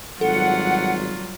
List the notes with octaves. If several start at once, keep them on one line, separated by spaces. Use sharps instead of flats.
G#1 F#3 G3 F4 A4 F#5